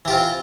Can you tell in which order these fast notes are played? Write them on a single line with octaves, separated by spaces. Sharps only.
E3 G4 F4 C4